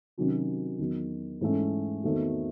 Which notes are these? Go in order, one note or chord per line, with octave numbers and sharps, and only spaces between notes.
C3 D#3 F#3 C#4 F#4
E2 D#3 F#3
G#2 E3 A3 C#4
E2 D#3 A3 C4 F#4